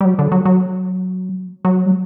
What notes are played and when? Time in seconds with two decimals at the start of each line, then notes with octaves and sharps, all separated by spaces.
0.01 G3
0.05 F#3
0.19 D3
0.32 F#3
0.45 F#3
1.65 F#3
1.86 G3